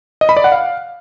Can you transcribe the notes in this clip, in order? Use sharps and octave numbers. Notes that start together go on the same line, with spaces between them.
D#5
B5
D5
F#5
F5